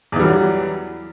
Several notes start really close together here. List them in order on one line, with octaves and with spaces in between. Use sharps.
E2 E3 G3 F#3